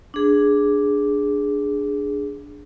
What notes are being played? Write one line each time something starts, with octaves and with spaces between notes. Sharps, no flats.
D4 G#4